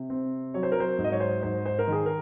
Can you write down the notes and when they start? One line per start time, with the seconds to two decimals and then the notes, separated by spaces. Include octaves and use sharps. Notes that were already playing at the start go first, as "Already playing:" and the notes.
Already playing: C3
0.10 C4
0.54 F#3 C#5
0.63 C5
0.72 A#4
0.80 C5
0.98 G#2
1.04 D#5
1.12 C#5
1.20 C5
1.43 G#2 C5
1.66 C5
1.79 A#4
1.87 D#3 G#4
2.06 A#4